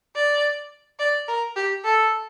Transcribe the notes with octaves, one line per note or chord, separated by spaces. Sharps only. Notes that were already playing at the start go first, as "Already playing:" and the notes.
D5
D5
A#4
G4
A4